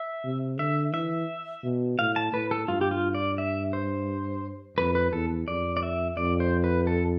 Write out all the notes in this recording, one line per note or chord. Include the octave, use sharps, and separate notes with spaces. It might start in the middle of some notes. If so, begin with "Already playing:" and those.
Already playing: E5
C3
D3 E5
E3 E5
B2
A2 F5
A5
A2 B4
A4
G2 F4
G4
F4
D5
E5
C5
F2 B4
B4
E2 A4
F2 D5
D5
E5
F2 D5
C5
B4
A4